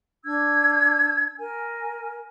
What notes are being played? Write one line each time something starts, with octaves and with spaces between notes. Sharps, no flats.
D4 E6 G#6
A#4 G#5